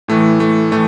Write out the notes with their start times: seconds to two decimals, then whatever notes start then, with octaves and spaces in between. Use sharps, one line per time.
0.08 A2 E3 A3
0.40 A3
0.71 A2 E3 A3